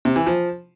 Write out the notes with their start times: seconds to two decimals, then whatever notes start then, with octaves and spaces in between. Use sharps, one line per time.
0.05 C3
0.16 E3
0.26 F3